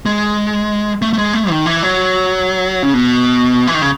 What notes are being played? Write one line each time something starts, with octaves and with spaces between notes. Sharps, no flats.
G#3
A3
A3
G#3
A3
D#3
E3
F#3
C#3
B2
E3
D#3
C#3